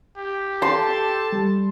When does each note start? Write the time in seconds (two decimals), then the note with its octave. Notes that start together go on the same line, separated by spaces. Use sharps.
0.17 G4
0.62 A4 A5 C6
1.32 G3